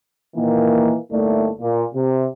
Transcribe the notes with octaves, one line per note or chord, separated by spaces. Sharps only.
A#2 D#3 E3 A#3
G1 A2 A3 A#3 D#4 D5
A#2
C3